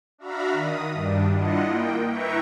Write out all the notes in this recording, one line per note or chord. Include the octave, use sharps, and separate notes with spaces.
D4 F#4 E5 F5 A#5 B5
D#3 D#6
G2 G3 D4
D4 E4 F4 D#5 F#5
A#3 G5
E4 B4 E5 G5 A#5 C#6